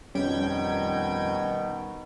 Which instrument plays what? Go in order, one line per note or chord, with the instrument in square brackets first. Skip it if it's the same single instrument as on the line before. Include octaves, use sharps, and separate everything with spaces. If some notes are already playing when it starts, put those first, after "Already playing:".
[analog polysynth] F2 G5 G#6 [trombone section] B2 D#3 [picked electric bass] G3 [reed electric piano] C#4